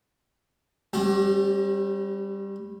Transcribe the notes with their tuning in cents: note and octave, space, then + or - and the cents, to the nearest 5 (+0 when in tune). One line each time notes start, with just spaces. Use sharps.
G3 +10 C#4 -45 G4 -35